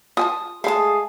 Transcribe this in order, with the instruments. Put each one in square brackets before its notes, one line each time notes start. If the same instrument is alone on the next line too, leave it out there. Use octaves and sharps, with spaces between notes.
[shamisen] F4 G#5 A5 [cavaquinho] D#6
[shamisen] G#3 A3 [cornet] G#4 [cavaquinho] F5 A5